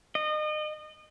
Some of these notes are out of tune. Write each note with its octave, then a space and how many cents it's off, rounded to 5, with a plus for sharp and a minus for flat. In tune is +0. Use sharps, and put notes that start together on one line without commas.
D#5 -30